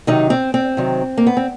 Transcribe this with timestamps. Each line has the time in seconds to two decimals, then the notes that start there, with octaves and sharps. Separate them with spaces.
0.07 C3 D#3 F#3 D#4
0.30 C4
0.54 C4
0.77 C3 D#3 F#3
1.17 A#3
1.27 B3
1.37 C4